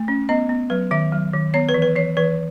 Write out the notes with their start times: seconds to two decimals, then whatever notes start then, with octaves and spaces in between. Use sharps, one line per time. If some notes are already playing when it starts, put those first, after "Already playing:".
Already playing: A3
0.08 C#4
0.29 B3 D#5
0.49 B3
0.70 F#3 B4
0.91 D#3 E5
1.12 F#3
1.33 D#3
1.54 B3 C#5
1.69 B4
1.74 E3
1.82 B4
1.96 E3 C#5
2.17 E3 B4